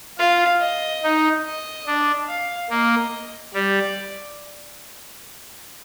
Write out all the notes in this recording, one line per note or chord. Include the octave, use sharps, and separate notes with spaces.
F4 F5
D#5
D#4
D#5
D4
F5
A#3 D#5
G3 D5